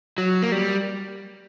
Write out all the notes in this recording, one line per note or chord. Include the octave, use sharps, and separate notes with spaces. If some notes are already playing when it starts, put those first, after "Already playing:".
F#3
A#3
G3